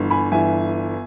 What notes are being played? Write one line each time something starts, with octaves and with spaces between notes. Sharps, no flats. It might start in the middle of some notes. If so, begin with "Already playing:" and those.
Already playing: G1 G2 E3
G#5 B5
G1 G2 E3 E5 G#5